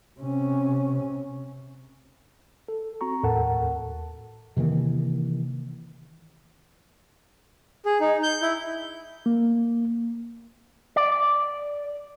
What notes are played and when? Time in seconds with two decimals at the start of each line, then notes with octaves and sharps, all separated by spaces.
0.20 C3 C#4
2.68 A4
3.01 C4 F#4 A#5 C#6
3.23 D#2 A2 A4 A#4 F#5 A5
4.56 C3 D#3 E3 A#3
7.86 G#4
8.01 D#4
8.23 G6
8.42 E4
9.26 A#3
10.96 D5